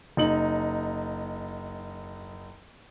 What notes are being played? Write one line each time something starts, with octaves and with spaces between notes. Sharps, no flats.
F#1 D#4 F#7